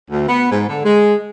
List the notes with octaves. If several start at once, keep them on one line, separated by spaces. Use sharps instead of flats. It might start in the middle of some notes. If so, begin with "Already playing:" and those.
D2
B3
G#2
D3
G#3